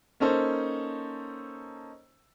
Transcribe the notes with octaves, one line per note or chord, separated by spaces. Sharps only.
A#3 C#4 D#4 A4 C5